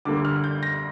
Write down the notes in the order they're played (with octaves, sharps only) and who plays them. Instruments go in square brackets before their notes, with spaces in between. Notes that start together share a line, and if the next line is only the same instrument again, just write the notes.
[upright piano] D2 D3 G3 A#3 D6
F6
G6
A#6